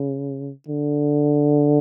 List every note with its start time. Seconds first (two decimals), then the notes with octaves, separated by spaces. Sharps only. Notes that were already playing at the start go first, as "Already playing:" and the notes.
Already playing: C#3
0.68 D3